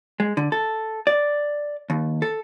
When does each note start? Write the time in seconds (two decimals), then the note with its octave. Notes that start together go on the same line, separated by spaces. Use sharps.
0.20 G#3
0.37 D3
0.52 A4
1.07 D5
1.90 D#2
2.22 A4